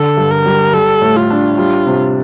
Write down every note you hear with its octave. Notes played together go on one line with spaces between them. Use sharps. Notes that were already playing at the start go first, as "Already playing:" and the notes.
Already playing: D3 A4
G2
A#4
G3
G3 A4
A2
F4
D4
G3 F4
C3